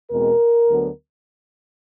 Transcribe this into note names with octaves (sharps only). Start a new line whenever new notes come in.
E2 B2 G#3 C4 A#4
D2 D3 F#3 B3